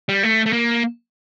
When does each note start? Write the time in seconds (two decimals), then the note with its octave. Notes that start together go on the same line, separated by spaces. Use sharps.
0.09 G3
0.23 A3
0.46 A3
0.53 A#3